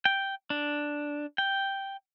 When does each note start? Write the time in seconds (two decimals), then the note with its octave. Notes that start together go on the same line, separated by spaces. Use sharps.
0.05 G5
0.50 D4
1.38 G5